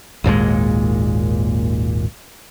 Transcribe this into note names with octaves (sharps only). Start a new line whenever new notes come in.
G#1 D#2 A#2 G#3